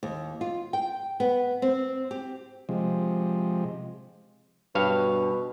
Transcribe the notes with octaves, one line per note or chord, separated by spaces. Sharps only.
D#2
F4
G5
B3
C4
G4
C3 F3 G#3
G2 B2 C#5 F5